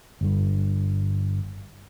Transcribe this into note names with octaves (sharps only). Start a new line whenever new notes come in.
G1 G2